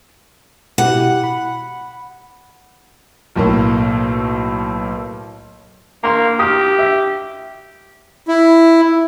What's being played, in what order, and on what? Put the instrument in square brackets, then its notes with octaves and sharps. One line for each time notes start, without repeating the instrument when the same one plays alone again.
[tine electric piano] B2 E4 G4 [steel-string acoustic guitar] F#5
[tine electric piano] B5
[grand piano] B1 A2 A#3
[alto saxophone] A#3 [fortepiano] A#5 C6
[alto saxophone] G4 [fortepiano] D#6 F6
[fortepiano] E5
[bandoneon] E4